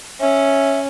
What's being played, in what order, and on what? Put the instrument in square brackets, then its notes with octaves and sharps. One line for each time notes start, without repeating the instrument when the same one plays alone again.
[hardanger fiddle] C#4 [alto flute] E5